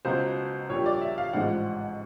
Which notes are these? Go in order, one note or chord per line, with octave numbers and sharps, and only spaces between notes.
C#2 B2 F#3 C5
A#1 A#2 G3 C#5
D5
E5
F5
A1 G#2 F3 G#3 F#5